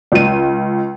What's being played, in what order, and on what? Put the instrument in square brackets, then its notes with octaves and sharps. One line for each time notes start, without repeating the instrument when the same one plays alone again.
[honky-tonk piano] C#2 D#7